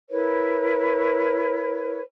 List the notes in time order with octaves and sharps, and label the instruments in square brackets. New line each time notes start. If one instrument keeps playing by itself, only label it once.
[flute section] E4 A#4 B4 C#5